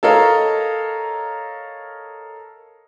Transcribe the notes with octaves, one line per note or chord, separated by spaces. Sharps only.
A4 A#4 C#5 D#5 F5 A#5